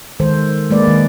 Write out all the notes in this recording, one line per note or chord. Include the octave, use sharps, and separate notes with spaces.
D#3 G#3 A4 C5
G#3 A#3 B4 D5
D#3